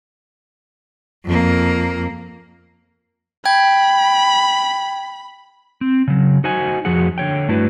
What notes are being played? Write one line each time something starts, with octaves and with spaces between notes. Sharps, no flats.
F2 A#3
G5 B5 G#6
C4
C#3 F#3
D#4 F#4 C5 D#5 F#5 G#5
F2 F3 F#4 G#4 F#5
D3 C#5 G5
G2 A3 D4 E4 F#4 B4